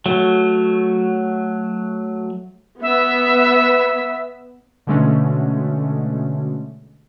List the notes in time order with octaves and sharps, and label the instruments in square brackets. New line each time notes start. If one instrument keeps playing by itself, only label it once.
[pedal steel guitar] F#3 A3
[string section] B3 [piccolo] E5
[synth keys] B2 D3 G#3 A3 C#4